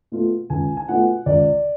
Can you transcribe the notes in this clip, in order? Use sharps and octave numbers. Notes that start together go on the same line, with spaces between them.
B2 A3 F4
C#2 G#5
G#5
B2 A3 F4 F#5
C#2 D5